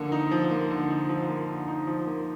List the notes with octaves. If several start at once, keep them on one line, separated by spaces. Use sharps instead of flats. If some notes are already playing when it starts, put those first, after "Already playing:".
Already playing: D3 F3 A#3 D#4
D#4
F3
A#3
D3
D#4
F3
A#3
D3
D#4
F3
A#3